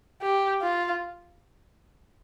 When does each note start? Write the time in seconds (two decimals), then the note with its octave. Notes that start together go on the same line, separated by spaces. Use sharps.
0.22 G4
0.62 F4